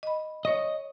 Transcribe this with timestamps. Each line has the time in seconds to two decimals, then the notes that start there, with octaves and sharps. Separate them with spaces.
0.03 D#5 B5
0.45 C#5 D#5 C#6 A#6